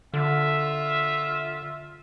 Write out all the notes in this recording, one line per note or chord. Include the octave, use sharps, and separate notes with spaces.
D3 F4 E5